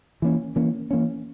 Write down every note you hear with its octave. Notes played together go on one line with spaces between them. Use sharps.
E3 A#3 C#4
E3 A#3 C#4
E3 A#3 C#4